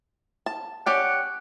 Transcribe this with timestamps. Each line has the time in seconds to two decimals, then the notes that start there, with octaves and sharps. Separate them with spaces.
0.46 A5
0.86 C#4 G4 D5 F#5